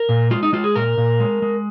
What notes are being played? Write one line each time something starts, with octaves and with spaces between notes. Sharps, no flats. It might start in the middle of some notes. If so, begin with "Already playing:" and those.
Already playing: A#4
A#2
G#3 F4
D#4
G#3 F4
G#4
A#2 A#4
A#2
G#3
G#3